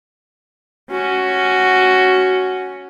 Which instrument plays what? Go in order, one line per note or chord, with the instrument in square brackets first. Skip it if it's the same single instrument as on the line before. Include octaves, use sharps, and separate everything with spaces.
[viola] C#4 F#4